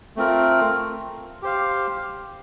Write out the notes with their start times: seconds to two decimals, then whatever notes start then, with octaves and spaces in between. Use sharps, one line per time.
0.16 A3 C4 F4 A#4
1.42 G4 C5 F5